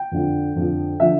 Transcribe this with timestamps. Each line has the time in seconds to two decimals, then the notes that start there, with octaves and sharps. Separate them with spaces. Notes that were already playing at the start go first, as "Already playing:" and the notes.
Already playing: G5
0.11 F2 D3 F3
0.56 F2 D3 F3
1.00 D3 F3 E5